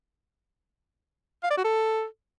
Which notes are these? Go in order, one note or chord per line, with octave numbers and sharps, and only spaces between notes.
F5
D5
F#4
A4